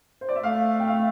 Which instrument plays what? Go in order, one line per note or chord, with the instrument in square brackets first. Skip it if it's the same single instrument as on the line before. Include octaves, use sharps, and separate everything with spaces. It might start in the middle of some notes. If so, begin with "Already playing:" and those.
[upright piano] C5
D5
E5
[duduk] A3 [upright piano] F5
[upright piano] G5
F5